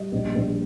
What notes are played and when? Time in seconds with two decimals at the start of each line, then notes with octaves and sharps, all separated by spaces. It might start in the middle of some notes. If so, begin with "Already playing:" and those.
Already playing: G3 D#5
0.12 A#1
0.35 A#1